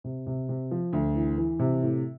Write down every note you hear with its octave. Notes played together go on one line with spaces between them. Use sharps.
C3
C3
C3
F3
D2
E3
E3
C3
A2